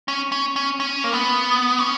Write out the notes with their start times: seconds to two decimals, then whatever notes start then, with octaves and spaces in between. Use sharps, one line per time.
0.08 C#4
0.32 C#4
0.56 C#4
0.80 C#4
1.04 A#3
1.13 B3
1.79 C#4